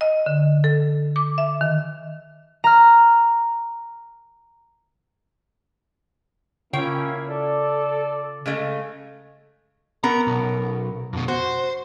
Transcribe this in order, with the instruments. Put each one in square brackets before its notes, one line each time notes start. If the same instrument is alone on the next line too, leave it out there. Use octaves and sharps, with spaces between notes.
[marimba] D#5
D3
A4
D6
E5
D#3
[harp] A#5 F6
[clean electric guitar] C#3 F4 C#5 [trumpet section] A#3 E4 [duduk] C#4 [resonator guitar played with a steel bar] G5
[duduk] A4 [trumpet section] D5
[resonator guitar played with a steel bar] C#3 G#3 A3
[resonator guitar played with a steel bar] B3 C#4 A#4 [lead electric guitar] A#5
[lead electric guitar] B1
F2 B2
[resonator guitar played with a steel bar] F#4 [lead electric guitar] C5